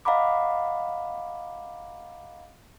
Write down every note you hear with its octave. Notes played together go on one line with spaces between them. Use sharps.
D#5 F5 F#5 A#5 B5 D6